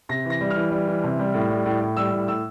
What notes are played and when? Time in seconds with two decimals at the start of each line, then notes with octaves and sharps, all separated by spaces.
0.09 C3 A#6
0.25 E3
0.30 A#6
0.41 G3
0.50 F6
0.56 E3
0.71 G3
0.87 E3
1.04 C3
1.19 G3
1.34 A2
1.50 G3
1.66 A2
1.81 A2
1.97 G3 E6
2.12 A2
2.28 A2 E6